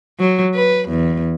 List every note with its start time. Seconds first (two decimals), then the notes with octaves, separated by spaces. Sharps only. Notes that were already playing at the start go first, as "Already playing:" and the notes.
0.20 F#3
0.55 B4
0.89 E2